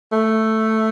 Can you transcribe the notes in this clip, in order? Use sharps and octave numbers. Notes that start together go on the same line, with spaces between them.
A3